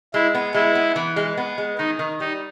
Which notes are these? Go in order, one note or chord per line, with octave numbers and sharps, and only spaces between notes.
G#3 E4
B3
G#3 E4
B3
E3
G#3
B3
G#3
D#3 D#4
D#3
G3 D#4